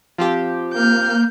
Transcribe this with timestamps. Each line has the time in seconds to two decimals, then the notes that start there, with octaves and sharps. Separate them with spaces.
0.18 F3 C4 G4
0.74 A#3 F6 G6